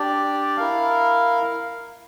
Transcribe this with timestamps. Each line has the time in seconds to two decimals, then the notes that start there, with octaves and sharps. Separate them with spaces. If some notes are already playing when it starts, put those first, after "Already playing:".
Already playing: D4 G4 D5
0.57 E4 A#4 F5